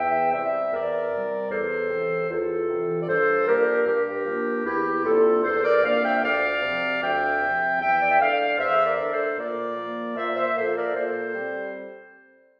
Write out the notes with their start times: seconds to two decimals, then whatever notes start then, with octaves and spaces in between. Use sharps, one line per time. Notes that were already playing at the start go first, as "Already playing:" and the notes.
Already playing: E2 E5 G5
0.32 C3 G3 C5 E5
0.72 E2 A#4 D5
1.11 C3 G3
1.50 E2 A4 C5
1.90 C3 E3
2.29 E2 F4 A4
2.69 C3 E3
2.99 D5
3.08 G2 A4 C5
3.47 F3 A#3 D4 G4 A#4
3.86 G2 G4 A#4
4.26 F3 A#3 D4
4.65 E2 E4 G4
5.04 C3 F3 A#3 D4 F4 A4
5.44 E2 A4 C5
5.63 A#4 D5
5.83 C3 F3 A#3 D4 D5 F5
6.03 E5 G5
6.22 D2 D5 F5
6.62 C3 F3 C4
7.01 D2 E5 G5
7.40 C3 F3 C4
7.80 E2 E5 G5
8.02 D5
8.10 E5
8.19 D3 A3 D5 F5
8.58 E2 C5 E5
8.85 A#4 D5
8.98 D3 A3
9.11 A4 C5
9.37 A#2 A#4 D5
9.77 F3 A#3
10.16 A#2 C5 E5
10.35 C5 E5
10.55 F3 A#3 A4 C5
10.75 A#4 D5
10.94 A#2 A4 C5
11.34 G3 C4